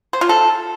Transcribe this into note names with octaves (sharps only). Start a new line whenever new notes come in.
C5
F4
A4